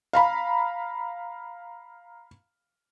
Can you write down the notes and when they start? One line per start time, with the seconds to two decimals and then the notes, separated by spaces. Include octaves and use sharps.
0.13 F5 A#5 B5